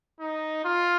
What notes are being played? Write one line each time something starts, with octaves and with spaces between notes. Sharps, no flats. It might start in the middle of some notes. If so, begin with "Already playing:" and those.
D#4
F4